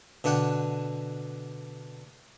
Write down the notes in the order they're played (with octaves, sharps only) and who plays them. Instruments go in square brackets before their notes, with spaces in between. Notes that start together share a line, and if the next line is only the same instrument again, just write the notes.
[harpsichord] B2 D3 D4 F#5 G5